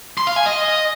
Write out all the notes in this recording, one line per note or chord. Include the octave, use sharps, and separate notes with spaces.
C6
F5
G#5
D#5